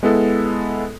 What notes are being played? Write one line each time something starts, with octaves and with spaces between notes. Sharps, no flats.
G#3 B3 E4 A4